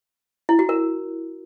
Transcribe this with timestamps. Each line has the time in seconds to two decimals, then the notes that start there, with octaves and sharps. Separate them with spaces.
0.49 E4
0.59 F#4
0.69 A#4